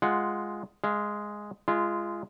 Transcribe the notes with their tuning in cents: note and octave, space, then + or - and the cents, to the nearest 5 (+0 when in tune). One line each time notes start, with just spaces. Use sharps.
G#3 +0 F4 +0 F#5 +5
G#3 +0 F5 -25
G#3 +0 F4 -25